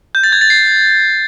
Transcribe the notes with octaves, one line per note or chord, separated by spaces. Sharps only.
G6
A6
G#6
A6
C7